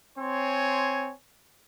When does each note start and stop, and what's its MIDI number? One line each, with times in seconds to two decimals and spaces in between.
0.19 1.12 60
0.19 1.12 73
0.19 1.12 80
0.19 1.12 84